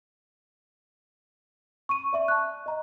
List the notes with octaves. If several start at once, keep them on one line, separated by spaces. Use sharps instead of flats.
C#6 D#7
D5 E5 C#6
A5 F#6
D#5 A#5